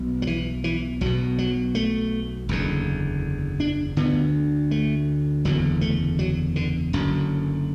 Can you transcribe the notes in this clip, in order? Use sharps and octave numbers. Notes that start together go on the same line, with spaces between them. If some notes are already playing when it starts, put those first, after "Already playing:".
Already playing: B1 B2
F#3
E3
E3
B1 B2 F#3
F#3
A3
F#1 E2 D3
D4
D2 D3 B3
A3
F#1 E2 D3 F#3
A3
F#3
D3
F#1 F#2 D3